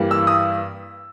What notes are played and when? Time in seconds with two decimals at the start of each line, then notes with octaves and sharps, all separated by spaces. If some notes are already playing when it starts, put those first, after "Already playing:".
Already playing: G2 E3 G3 A#3
0.11 E6
0.27 D#6